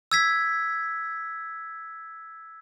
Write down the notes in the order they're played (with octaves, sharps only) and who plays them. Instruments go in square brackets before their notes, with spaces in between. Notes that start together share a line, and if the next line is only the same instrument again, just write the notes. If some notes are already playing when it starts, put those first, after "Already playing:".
[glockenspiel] E6 G#6 B6